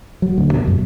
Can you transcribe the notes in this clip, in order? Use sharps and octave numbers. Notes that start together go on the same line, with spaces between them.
F#3
D2
B2
F#2